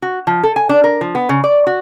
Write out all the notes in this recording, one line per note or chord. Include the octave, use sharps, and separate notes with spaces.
F#4
F3
A4
G#5
D4
A#4
F3
B3
C#3
D5
F#4